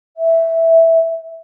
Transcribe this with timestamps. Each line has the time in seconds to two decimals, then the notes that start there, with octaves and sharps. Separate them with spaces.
0.17 E5